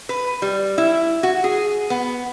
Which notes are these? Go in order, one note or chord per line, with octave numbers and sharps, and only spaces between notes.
B4
G3
E4
F#4
G#4
B3